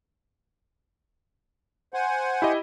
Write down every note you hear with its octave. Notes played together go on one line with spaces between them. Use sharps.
C5 F#5 G#5
E4 G4 D#5